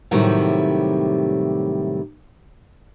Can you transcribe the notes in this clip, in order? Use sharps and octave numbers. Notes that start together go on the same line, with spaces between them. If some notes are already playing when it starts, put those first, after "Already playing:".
A2 C3 D#3 F#3 G3 E4